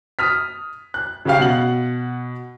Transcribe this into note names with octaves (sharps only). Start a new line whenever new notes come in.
D#6 F6 B6
F#6
C#3 C#4 F#4 G4 F5
B2 F#5 F#7